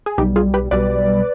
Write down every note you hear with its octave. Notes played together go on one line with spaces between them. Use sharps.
G#4
B1 B2 G3 D#4 G4
F4 G#4
G4 B4
B1 B2 G3 B4 D5